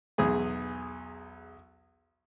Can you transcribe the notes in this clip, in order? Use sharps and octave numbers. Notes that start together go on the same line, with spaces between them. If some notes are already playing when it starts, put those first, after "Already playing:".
B1 E2 G#4 G#5